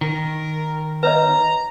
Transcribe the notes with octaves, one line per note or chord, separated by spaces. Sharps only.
D#3 A#4
B4 C#5 D#5 A#5